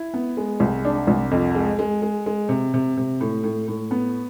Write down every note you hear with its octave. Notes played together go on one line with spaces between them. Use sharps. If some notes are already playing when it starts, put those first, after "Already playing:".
Already playing: E4
B3
G#3
C2
D4
C2
F2
G#3
G#3
G#3
G#3
C3
C3
C3
A2
A2
A2
B3